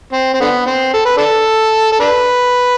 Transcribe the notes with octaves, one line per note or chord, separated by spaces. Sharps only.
C4
C4
D3 B3
C4
A4
B4
D4 A4
A4
D4 B4